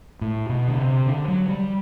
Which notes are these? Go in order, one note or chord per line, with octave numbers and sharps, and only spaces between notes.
A2
B2
D3
C3
D3
F#3
G3